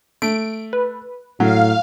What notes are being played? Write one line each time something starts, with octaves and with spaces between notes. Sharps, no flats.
A3 D7
B4
A2 F#3 F5